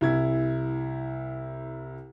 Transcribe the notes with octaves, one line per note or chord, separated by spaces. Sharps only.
C2 E4 G#6